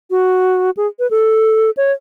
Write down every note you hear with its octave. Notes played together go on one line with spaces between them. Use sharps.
F#4
G#4
B4
A4
C#5